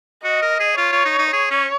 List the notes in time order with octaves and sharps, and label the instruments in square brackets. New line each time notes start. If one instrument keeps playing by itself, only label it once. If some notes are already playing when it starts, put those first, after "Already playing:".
[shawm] F#4 [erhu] D#5
[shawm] A#4
G#4
[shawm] F4 [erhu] C#5
[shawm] F4
D#4
D#4
[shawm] G#4 [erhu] C#5
[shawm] C#4